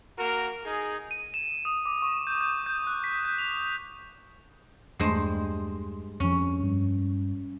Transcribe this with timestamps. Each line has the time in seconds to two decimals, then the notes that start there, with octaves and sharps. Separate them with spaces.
0.19 A#3 F#4 A#4
0.65 D#4 G#4
1.11 D#7
1.34 E7
1.65 D#6
1.86 D6
2.02 C#6
2.27 G6
2.41 G6
2.66 G6
2.87 F#6
3.04 B6
3.25 G6
3.38 F7
4.99 E2 G2 G#3 A3 C5
6.20 F2 F3 C#4
6.63 G2